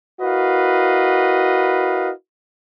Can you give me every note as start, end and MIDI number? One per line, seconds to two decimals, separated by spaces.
0.21 2.10 64
0.21 2.10 66
0.21 2.10 70
0.21 2.10 71
0.21 2.10 75
0.21 2.10 77